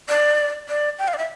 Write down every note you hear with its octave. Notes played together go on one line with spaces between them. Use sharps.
D5
D5
G5
F5
D5
E5